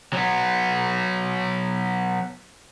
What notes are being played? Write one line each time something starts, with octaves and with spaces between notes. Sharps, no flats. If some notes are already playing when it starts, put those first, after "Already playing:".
F#3 B3